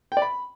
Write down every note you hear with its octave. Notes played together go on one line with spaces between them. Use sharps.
G5
D5
B5